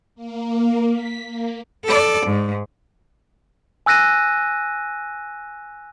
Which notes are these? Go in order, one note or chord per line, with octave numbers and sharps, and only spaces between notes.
A#3
B6
A#3
A4 D5
G#2
G#5 E6 F#6 A#6 D#7